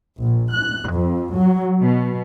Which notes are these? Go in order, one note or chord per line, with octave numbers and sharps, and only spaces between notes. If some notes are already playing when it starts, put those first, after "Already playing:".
A#1
F#6
F2
F#3
B2